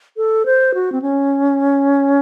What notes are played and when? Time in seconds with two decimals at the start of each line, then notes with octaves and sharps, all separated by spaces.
0.17 A4
0.46 C5
0.74 F#4
0.92 C4
1.02 C#4